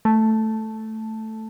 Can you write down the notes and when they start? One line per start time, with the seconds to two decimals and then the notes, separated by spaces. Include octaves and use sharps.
0.05 A3